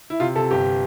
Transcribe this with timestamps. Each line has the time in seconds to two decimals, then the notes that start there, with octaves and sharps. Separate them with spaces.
0.10 E4
0.20 C3 F4
0.36 C3 A4
0.51 G1 G4